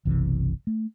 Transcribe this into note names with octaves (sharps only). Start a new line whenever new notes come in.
F#1 B1 C3 E3
A3